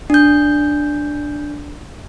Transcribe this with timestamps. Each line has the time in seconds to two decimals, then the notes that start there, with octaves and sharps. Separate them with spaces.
0.10 D4 G6